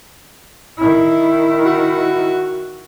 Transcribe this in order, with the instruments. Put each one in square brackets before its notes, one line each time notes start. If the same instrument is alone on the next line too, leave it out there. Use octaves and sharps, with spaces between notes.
[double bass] D#3 E4
[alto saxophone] F#4